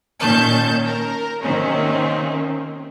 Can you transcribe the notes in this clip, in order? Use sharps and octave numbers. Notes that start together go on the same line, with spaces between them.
A#2 D#3 C#4 A5 G6
A#4
C3 D#3 A#3 C4 C#4